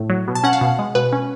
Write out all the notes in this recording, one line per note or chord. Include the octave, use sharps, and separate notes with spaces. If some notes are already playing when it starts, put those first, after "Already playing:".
Already playing: A2 A3
F#3
B2
A5
C#4 F#5
F5
B2
G#3
B2 B4
C#4